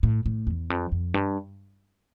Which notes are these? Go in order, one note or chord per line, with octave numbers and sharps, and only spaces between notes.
A2
A2
E2
F2
F2
G2